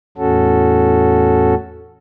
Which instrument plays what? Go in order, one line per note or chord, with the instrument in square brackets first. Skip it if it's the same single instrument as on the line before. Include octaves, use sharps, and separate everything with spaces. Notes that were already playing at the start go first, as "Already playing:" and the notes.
[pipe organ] E2 A2 C#4 F#4 A4